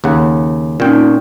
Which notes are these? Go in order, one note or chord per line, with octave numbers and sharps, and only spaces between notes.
D#2 C#3 F#5
A#2 C4 C#4 D#4 G5